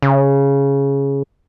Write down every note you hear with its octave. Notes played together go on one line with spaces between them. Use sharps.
C#3